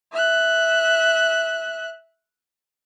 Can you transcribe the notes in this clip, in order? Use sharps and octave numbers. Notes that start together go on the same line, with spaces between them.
E5 F#6